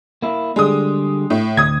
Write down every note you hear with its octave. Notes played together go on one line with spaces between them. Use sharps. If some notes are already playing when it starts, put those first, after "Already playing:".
A#3 E4
D3 G3 G#3 D#6
A2
D2 D#6 G#6